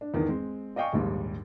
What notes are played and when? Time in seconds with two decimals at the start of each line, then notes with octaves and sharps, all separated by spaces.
0.01 D4
0.14 E2 D#3
0.28 G#3 C4
0.76 D5 D#5 F5 G5 G#5 C#6
0.93 A#1 D#2 G#2 G3